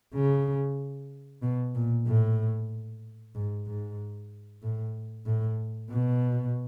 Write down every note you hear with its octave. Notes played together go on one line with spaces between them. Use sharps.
C#3
B2
A#2
A2
G#2
G#2
A2
A2
B2